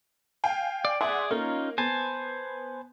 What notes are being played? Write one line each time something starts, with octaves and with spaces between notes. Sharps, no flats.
F5 G5 G#5
D5
G#4 D5 E5 F#5 C6
A#3 C#4 D#4 F4
B3 C5 G#5 A5